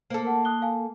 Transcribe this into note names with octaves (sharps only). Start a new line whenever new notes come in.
A#3 A4 C5
A#4 F#5
D#6 F#6 G7
F5 G#5 A5